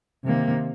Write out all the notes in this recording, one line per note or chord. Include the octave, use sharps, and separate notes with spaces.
C3 D#3 A#3